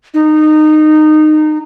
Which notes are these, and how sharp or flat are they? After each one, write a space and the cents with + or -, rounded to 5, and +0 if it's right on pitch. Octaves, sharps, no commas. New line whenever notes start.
D#4 -20